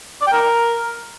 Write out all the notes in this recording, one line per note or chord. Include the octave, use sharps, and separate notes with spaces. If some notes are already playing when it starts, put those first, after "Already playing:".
D5
G5
A#4